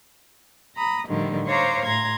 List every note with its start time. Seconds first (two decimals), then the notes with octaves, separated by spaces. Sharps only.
0.75 A#5 B5 D#6
1.07 A2 D3 D#3 F3 G3
1.46 C5 C#5 F5 A#5 C#6 D6
1.84 A2 A#5 C6 G#6